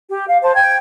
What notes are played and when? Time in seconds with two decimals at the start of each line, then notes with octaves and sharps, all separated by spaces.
0.09 G4
0.27 F5
0.42 C5 A5
0.55 G5 G#6